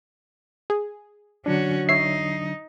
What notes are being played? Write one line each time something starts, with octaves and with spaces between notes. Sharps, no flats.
G#4
D3 F#3 C#4 D4 F#4
D#4 C#5 E5 C7